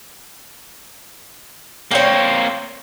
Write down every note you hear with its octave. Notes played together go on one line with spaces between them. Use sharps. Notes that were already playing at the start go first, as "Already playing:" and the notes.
A#3 C4 C#5 G5